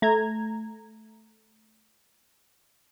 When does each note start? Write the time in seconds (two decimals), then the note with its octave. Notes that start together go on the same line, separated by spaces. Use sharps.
0.02 A3 A#5 G#6